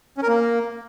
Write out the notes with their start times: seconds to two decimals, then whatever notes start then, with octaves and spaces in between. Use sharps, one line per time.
0.17 C#4
0.23 A#4
0.28 A#3